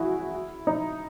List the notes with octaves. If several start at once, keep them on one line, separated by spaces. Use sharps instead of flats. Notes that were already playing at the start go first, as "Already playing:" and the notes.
Already playing: E4 F#4 G#4
D#4